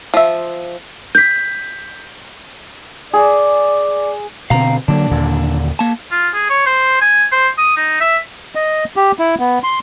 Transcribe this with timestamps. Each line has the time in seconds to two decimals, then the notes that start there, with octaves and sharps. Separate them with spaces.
0.14 F3 E5
1.15 G6 B6
3.13 G#4 D5
4.50 B2 D3 C4 F5 A#5
4.88 D3 F#3 A#3 D4
5.11 D#2 A#2 D3
5.79 A#3 A5
6.11 F4
6.35 G#4
6.50 C#5
6.66 C5
7.01 G#5
7.32 C5
7.58 D#6
7.77 D#4
8.01 E5
8.55 D#5
8.96 G4
9.19 E4
9.39 B3
9.64 C6